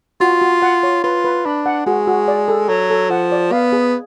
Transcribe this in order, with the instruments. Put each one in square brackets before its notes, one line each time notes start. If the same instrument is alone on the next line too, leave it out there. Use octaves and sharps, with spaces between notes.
[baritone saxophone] F4 [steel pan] F#4
[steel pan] F#4
F#5
C#5
[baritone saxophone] F4 [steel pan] B4
[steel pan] B4
[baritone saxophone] D4 [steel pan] B5
[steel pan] F#5
[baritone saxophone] G#3 [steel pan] F#4
[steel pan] F#4
D5
A4
[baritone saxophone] F#3 [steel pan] A4
[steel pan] A4
[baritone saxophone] F3 [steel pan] F#5
[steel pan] D5
[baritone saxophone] B3 [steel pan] F5
[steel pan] G#4